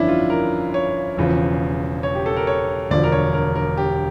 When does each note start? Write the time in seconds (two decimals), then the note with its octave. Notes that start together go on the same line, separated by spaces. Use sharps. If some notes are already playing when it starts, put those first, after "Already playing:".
Already playing: G1 F2 E3 C#4 D4 E4
0.08 F4
0.30 A#4
0.74 C#5
1.17 E1 E2 C#3 F3
2.03 C#5
2.15 G4
2.26 A4
2.37 A#4
2.47 C#5
2.91 E1 D2 D3 F3 D5
3.04 A#4
3.12 C#5
3.34 A#4
3.56 A#4
3.77 G4